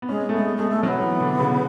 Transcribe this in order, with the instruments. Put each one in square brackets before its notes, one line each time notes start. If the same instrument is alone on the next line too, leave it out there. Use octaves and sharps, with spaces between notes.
[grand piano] B3
[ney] G#3 [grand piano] C#4
[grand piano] A3
B3
[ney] G#3
[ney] G#3 [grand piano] A3
[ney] A3
[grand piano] F#3 [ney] C#4
[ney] B3
[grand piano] E3
D3
C#3